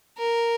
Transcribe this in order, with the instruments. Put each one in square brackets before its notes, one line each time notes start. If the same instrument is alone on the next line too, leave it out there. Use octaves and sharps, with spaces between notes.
[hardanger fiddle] A#4